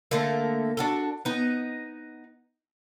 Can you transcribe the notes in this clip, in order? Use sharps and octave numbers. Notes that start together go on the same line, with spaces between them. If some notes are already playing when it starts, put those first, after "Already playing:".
D3 A3 A#3
D4 F#4 A4
B3 D#4